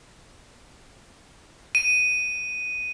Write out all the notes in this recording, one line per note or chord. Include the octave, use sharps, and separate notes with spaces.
D#7